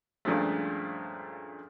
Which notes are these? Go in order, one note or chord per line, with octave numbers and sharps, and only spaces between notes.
G2 A#2 C#3 F3 G#3 A3